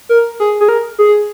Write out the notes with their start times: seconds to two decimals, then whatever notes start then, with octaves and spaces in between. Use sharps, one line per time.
0.09 A#4
0.40 G#4
0.61 G#4
0.69 A#4
0.99 G#4